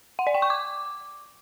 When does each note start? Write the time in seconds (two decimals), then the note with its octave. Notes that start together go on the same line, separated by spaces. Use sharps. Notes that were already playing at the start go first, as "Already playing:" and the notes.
0.19 F#5
0.27 D5
0.34 G5
0.42 C#6
0.50 D6